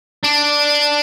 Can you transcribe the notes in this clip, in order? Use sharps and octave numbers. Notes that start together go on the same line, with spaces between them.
D4